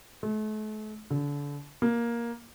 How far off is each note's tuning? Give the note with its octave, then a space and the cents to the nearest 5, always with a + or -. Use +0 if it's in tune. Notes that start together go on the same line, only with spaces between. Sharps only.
A3 -40
D3 -30
A#3 +10